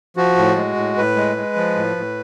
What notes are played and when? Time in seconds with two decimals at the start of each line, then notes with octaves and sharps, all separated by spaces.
0.16 F3 F#4
0.37 A2
0.56 G#3
0.76 A2
0.97 A2 B4
1.16 G#3
1.37 G#3
1.56 F3
1.76 A2
1.96 A2